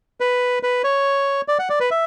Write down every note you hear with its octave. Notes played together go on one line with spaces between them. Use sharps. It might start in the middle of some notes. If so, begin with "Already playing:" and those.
B4
B4
C#5
D5
F#5
D5
B4
E5